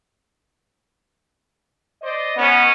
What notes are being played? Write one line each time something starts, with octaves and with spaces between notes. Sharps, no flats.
C5 D5 D#5
G#2 B3 C#4